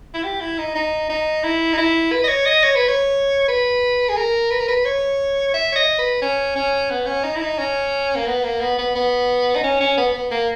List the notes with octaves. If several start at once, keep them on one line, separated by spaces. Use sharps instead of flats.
E4
G4
E4
D#4
D#4
D#4
E4
D#4
E4
B4
D#5
C#5
D#5
C#5
B4
C#5
B4
G#4
A#4
B4
A#4
B4
C#5
E5
C#5
D#5
B4
C#4
C#4
B3
C#4
D#4
E4
D#4
C#4
A#3
B3
A#3
B3
B3
B3
D#4
C#4
C#4
B3
B3
A#3